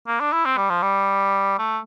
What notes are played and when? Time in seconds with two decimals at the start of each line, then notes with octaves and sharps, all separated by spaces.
0.07 A#3
0.20 D4
0.32 E4
0.45 C4
0.57 G3
0.70 F3
0.82 G3
1.58 A3